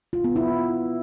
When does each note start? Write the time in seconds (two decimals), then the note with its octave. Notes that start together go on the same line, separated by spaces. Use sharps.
0.13 F4
0.24 B3
0.36 E4